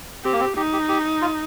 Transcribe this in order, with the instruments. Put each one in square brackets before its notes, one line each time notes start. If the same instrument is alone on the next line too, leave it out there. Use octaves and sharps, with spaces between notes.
[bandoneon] C4 [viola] G4
[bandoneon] A#3
C4
[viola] D#4 [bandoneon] G4
[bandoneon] G4
G4
F4